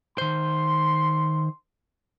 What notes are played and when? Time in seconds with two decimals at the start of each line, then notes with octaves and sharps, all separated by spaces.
0.18 D#3 C5 C6